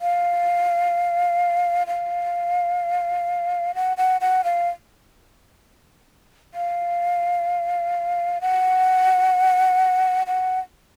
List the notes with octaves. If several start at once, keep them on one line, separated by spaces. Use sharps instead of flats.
F5
F5
F#5
F#5
F#5
F5
F5
F#5
F#5